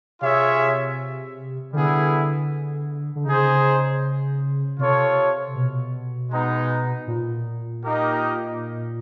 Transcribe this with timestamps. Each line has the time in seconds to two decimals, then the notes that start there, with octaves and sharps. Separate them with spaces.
0.21 C3 F4 G#4 C#5 E5
1.73 D3 G3 B3 E4 G#4
3.16 D3
3.26 C#3 D#4 G#4 C5
4.79 C3 F4 A4 C#5
5.55 B2
6.31 G#3 B3 D#4
7.07 A#2
7.84 A#3 D#4 G4 A#4 D#5